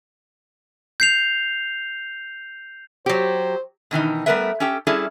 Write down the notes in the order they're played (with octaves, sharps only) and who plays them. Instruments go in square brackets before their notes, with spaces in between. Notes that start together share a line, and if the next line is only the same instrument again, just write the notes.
[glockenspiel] G6 C7 F7
[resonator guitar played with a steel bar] F#3 G4 [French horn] C5
[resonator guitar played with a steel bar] B2 D#3 E3 D#4
G3 A3 B3 A#4 B4 E5
C#4 G4 A4 G5
G3 C#4 D4 E4 G#4 A4